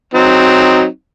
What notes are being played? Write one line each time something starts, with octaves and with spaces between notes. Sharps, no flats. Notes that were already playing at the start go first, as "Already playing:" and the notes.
F#3 C4 D#4